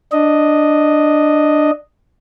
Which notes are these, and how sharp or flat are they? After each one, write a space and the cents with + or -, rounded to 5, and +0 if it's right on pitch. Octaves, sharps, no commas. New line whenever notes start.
D4 +10 D#5 +0